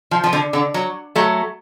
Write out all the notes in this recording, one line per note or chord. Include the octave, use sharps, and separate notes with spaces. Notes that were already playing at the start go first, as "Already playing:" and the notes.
F3
F3
D3
D3
F#3
F#3 A3